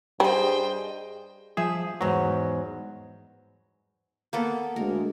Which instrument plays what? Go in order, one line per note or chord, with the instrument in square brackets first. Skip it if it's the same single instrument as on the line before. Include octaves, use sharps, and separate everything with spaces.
[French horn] G2 [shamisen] G3 [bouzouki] G#4 D#5 [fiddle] C5 G5
[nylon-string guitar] F3 E5 [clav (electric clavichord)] G#4
[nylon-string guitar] E2 G#2 [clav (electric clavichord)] F#3
[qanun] A#3 B3 A4
[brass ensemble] D2 G#3 [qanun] A#4